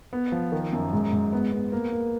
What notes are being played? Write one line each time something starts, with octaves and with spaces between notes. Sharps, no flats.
B3
F3
D#3
F#2
G#2
G#2
B3
B3
A#3
A#3